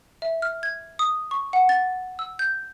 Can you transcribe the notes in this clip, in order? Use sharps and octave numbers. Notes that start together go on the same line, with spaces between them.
E5
F6
G#6
D#6
C#6
F#5
A6
E6
G6